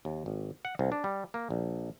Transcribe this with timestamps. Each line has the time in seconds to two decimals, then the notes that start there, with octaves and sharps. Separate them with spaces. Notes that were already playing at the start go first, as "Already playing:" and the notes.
0.05 D#2
0.26 G#1
0.65 F#5
0.79 C2
0.92 D4
1.04 G3
1.34 A#3
1.50 A#1